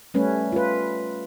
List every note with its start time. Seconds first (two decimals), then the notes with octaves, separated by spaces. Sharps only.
0.14 G3 A3 C#4 B4
0.52 F4 B4